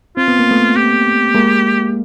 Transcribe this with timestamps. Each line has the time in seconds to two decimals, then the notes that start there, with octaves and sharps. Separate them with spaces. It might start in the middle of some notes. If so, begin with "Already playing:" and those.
0.17 C4 F4
0.28 B3
0.39 A#3
0.51 A3 B3
0.76 G4
1.34 G#3 A#3